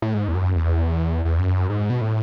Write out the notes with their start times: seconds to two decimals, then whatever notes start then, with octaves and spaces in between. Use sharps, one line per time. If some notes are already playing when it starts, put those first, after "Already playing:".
0.02 A2
0.14 G#2
0.28 E2
0.35 F#2
0.56 E2
1.25 E2
1.39 F#2
1.69 G#2
1.90 B2
2.01 A2